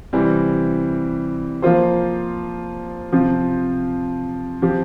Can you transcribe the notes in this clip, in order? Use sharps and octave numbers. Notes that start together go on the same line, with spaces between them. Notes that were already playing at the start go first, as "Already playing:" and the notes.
C3 E3 G3 C4
F3 A#3 F4 C5
C3 F3 C4 F4
F3 C4 G4